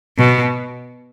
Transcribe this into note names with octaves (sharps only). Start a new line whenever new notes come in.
B2